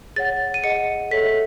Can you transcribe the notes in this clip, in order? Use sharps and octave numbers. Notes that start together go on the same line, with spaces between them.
G#4 C#5 F#5 A6
D#7
G#4 D#5 F#5 C#7
A4 C#5 E5 B6